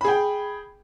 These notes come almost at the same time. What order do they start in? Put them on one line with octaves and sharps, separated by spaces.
B5 G#4 G5